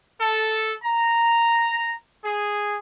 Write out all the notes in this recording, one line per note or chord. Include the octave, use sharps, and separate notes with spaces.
A4
A#5
G#4